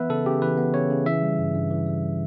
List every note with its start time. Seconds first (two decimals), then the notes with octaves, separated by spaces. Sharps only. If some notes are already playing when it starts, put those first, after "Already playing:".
Already playing: E3 B3 B4 E5
0.09 C#3 A4
0.26 C#3 G4
0.42 E3 B4
0.58 B3
0.74 C#3 C#5
0.90 C#3
1.06 E3 E5
1.22 G3
1.39 G2
1.54 G2
1.70 E3
1.86 G3